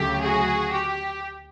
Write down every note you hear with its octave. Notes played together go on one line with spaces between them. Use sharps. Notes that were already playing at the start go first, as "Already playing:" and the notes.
Already playing: D2 C#3 F#3 A3 G4
F#4 G#4
G4